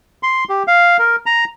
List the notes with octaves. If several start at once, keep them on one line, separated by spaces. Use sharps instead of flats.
C6
G4
F5
A#4
A#5